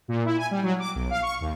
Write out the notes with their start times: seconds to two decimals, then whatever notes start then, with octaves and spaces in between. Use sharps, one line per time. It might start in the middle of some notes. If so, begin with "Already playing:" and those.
0.08 A#2
0.25 E4
0.38 G#5
0.51 G3
0.63 F#3
0.79 D6
0.95 B1
1.10 F5
1.23 C#6
1.41 D#2